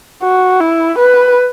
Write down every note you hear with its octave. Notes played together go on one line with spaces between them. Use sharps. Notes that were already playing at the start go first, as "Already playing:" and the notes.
F#4
E4
B4